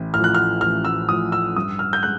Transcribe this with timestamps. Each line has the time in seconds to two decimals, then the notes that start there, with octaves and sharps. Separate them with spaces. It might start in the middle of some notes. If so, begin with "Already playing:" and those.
Already playing: A1
0.14 A2 F3 F6
0.24 F#6
0.35 F6
0.61 A1 F6
0.85 E6
1.09 A2 F3 D#6
1.32 E6
1.56 G2 D#6
1.79 F6
1.93 G6
2.03 G#3 F#6